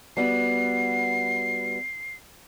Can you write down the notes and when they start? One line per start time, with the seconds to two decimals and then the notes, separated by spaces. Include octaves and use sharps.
0.17 G3 B3 F#4 C7